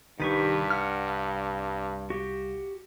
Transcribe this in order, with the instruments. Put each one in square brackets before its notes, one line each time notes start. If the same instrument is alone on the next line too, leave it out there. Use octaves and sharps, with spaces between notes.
[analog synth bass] C2 [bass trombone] G2 [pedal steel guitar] D#3 B4 C#6 [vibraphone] D#4 G4
[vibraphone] F5 [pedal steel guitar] F#5 F6
[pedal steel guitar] F#4 G4